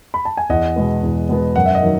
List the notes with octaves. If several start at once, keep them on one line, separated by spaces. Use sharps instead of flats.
B5
A5
G#5
E2 D#5 F#5
B2 G#3 B3
E2
B2 G#3 B3
F#2 F#5
E5
D#5
D#3 F#3